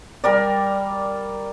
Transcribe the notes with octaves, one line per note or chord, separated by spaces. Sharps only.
G3 A#4 D5